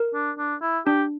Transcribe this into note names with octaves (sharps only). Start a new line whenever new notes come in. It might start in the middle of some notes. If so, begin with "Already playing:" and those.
Already playing: A#4
D4
D4
E4
D4 G4